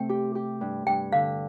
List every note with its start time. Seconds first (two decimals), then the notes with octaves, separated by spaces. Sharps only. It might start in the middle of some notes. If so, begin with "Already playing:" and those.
Already playing: C3 A3 C4 G5
0.09 G4
0.35 G4
0.61 G2
0.87 G2 G5
1.12 D3 F5